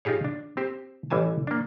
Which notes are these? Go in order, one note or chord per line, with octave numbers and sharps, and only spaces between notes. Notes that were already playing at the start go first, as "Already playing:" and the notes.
D#4 F4 G4 G#4 C#5
D4
C4 G4 C5
A1 E3 G3 G#5 A5
A#3 D4